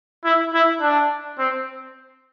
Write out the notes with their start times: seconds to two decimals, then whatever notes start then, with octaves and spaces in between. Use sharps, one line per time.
0.25 E4
0.54 E4
0.81 D4
1.39 C4